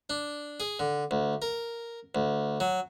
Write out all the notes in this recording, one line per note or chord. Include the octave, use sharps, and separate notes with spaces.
D4
G#4
D3
D2
A#4
D2
F#3